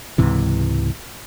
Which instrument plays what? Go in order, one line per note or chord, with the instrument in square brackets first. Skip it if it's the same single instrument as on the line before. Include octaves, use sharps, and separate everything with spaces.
[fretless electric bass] C#2 G#2 C3 E3